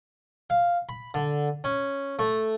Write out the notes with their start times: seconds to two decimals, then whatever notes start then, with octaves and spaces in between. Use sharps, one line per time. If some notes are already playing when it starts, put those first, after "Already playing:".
0.50 F5
0.89 B5
1.14 D3
1.64 C#4
2.19 A3